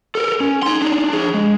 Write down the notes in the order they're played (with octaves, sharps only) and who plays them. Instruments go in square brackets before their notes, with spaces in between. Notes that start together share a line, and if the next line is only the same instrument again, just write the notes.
[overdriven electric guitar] A4 A#4
C#4
D#4 C6
D4 D#4
D4 G#4
G#3